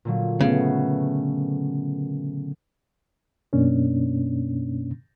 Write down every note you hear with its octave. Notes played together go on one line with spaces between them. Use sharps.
A#2 D3 F#3
C#3 A3 B3
F#2 B2 A#3 C#4 D4